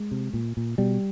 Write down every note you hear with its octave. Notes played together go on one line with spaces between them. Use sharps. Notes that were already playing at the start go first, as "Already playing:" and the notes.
Already playing: G#3
C3
A#2
A#2
B2 G3